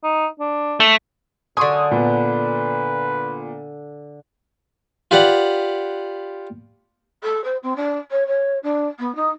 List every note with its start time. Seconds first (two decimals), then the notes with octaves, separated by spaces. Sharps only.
0.04 D#4
0.39 D4
0.80 A3
1.57 F#2 D3 G#5 C6 C#6 D#6
1.91 A#2 B3 B4
5.11 F4 G4 B4 D5 F#5
7.23 A4
7.43 C5
7.62 C4
7.75 D4
8.10 C#5
8.26 C#5
8.62 D4
8.99 B3
9.15 D#4